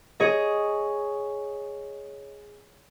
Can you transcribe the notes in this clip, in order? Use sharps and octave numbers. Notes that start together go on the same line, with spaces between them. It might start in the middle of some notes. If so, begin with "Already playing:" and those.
G#4 C#5 D#5